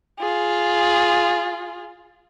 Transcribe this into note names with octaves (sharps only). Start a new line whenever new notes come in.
F4 G#4